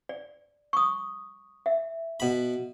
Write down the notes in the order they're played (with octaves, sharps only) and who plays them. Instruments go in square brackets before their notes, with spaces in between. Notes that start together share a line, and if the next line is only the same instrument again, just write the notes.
[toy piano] D5
C#6 D#6
E5
[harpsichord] B2 B5